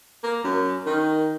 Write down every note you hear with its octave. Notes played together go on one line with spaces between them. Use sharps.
A#3
F#2
D#3